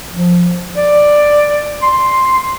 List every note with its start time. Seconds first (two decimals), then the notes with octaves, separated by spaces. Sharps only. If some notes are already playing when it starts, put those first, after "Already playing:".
0.13 F3
0.76 D5
1.82 C6